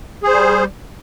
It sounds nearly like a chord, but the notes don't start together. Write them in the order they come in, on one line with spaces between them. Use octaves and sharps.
G#4 C5 G3